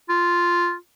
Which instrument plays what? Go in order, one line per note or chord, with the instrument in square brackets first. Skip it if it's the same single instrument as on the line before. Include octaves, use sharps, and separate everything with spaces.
[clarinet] F4